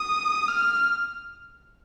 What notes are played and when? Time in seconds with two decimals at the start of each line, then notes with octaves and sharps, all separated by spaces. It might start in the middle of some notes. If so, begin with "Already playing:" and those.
Already playing: D#6
0.48 F6